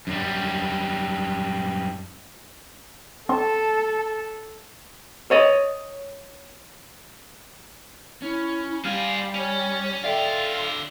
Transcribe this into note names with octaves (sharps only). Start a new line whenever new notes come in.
F#2 G3
C4 A4 A5 C6
C#5 D#5
C#4 E4
G3 C5 F5 G#5 F6
C#4 C#5
D3 F4 A4 D5 E5 F5 G5